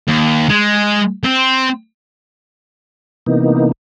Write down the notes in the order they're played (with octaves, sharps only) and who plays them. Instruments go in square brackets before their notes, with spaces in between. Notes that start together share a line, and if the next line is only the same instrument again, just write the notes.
[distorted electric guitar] D#2
G#3
C4
[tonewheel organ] C3 E3 A#3 B3 D#4